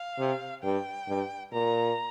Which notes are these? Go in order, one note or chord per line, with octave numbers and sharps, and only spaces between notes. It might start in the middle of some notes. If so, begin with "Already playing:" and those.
Already playing: F5
C3
G2 G5
G2
A#2 A#5